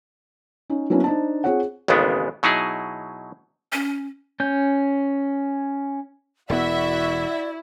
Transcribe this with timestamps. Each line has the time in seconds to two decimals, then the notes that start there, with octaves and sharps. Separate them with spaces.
0.70 C#4 D#4
0.90 F#3 A#3 B3 C#4 D4 E4
1.04 D4 D#4 C5 A5
1.44 C4 F4 G#4 C#5 F#5
1.88 A1 D#2 C#3 G#3 B3 D4
2.43 B2 F#3 D#4 E4 G#4
3.72 C#4
4.40 C#4 G6
6.50 E1 B3 E4 F#4 D5 E5